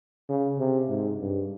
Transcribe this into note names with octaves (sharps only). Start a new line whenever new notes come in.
C#3
C3
G#2
G2